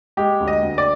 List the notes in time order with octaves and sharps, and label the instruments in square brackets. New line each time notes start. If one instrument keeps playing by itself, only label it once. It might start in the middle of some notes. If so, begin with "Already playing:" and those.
[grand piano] G#3 G4
D2
D#5
D2
D5